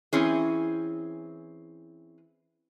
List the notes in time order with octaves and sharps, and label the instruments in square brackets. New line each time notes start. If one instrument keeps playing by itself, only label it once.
[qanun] E3 [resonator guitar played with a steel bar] C4 C#4 G#4